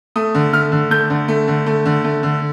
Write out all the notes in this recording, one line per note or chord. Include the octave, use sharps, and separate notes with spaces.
A3 D#6
D3
A3 F6
D3
A3 G6
D3
A3
D3
A3
D3
A3
D3